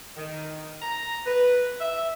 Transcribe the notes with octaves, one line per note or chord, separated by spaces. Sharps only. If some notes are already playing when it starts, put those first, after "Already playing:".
D#3
A#5
B4
E5